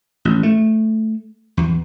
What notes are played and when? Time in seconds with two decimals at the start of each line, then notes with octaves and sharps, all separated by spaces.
0.25 A1
0.43 A3
1.57 E2